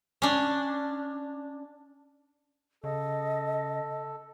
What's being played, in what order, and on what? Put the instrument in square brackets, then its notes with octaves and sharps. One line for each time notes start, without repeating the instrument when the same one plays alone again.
[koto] C#4 D4
[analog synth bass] C#3 [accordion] A4 [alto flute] D#5